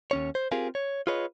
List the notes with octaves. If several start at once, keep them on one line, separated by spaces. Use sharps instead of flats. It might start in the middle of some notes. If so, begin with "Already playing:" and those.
D#2 C#4 C#5
C5
C4 F4 G4 G#4 A#4 F5
C#5
F4 G#4 B4 C#5 D#5